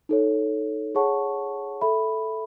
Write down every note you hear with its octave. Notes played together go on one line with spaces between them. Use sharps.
D#4 A4 C#5
G#4 C#5 F#5 A5 C#6
A4 E5 B5